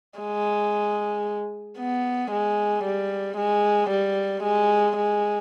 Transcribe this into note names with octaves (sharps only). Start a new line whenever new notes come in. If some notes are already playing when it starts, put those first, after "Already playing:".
G#3
B3
G#3
G3
G#3
G3
G#3
G#3